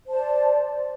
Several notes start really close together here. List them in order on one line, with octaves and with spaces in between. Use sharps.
C5 A5 D5